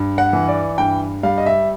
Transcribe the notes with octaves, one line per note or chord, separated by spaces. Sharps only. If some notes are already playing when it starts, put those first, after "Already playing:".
Already playing: G2
F#5
E3
D5
G2 G5
G3 F5
D#5
E5